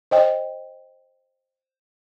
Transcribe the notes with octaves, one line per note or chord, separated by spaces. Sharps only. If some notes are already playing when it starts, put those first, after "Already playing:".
C5 D#5 G5